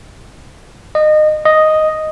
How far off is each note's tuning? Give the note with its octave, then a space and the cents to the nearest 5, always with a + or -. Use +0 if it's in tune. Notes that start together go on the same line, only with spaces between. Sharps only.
D#5 -25
D#5 +0